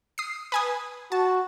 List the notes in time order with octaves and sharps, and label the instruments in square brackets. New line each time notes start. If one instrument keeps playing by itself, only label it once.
[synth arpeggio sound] D#6 C7
B4 G#5 D#6
[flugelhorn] F#4 [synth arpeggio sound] A5